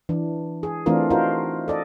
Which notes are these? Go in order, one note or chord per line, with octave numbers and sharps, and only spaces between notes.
E3 D4
G#4
E3 A3 C4 D4 F4 A#4
D#4 F4 F#4 A#4 C5
A4 D5 D#5